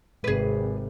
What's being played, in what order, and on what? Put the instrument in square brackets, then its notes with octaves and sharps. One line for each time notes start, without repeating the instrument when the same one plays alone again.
[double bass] G#1 C3 [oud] G#4 B4